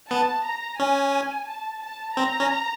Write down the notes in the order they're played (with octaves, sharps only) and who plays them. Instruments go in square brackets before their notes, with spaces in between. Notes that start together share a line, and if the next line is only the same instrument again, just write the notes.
[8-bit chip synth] B3 [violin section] A5
[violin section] A#5
[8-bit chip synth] C#4 [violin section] G#5
[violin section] A5
A5
[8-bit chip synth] C4 [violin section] A#5
[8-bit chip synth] C#4